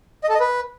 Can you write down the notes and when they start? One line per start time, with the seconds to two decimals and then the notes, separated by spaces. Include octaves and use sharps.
0.24 D#5
0.29 A4
0.35 D#5
0.40 B4